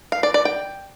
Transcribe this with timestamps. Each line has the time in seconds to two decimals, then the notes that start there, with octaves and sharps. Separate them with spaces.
0.12 F5
0.23 D5
0.34 D5
0.45 G5